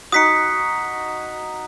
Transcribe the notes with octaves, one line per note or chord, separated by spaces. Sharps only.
D#4 F#4 D#6 B6 C#7